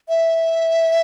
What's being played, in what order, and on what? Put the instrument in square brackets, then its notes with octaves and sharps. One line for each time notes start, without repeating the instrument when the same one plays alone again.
[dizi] E5